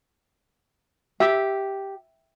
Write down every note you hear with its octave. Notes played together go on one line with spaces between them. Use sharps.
G4 E5